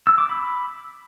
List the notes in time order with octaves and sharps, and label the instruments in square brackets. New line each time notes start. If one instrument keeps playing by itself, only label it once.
[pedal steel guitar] E6
D6
B5